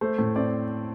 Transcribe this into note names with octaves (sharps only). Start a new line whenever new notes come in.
A3 C5
A2
C4 D5